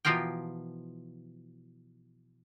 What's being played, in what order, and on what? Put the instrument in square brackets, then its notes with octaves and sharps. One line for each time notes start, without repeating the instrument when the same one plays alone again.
[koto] B2 E3 F3 F4 A#4 G5